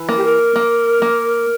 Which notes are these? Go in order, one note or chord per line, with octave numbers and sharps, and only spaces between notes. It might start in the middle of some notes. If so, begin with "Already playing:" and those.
Already playing: E3
A#3
G4
A#4
A#3
A#3